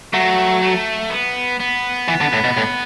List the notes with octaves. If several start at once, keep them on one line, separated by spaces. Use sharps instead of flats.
F#3 A3
A3
B3
B3
E3
D3
A2
B2
A2